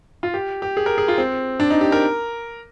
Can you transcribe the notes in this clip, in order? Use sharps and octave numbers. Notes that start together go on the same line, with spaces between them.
F4
G4
G4
G#4
A#4
G#4
F4
C4
D4
D#4
G4
A#4